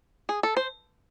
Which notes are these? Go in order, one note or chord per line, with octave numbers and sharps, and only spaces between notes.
G#4
A4
C5